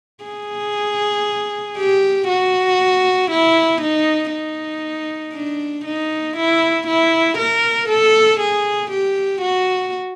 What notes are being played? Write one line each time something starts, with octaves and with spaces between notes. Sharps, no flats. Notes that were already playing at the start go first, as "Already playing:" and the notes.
G#4
G4
F#4
E4
D#4
D#4
D4
D#4
E4
E4
A#4
A4
G#4
G4
F#4